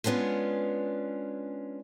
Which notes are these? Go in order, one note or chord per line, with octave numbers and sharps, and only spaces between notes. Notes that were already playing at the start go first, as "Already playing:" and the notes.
G#3 B3 C#4 D4 F4